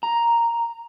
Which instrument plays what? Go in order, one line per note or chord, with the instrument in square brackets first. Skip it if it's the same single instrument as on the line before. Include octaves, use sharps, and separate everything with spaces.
[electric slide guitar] A#5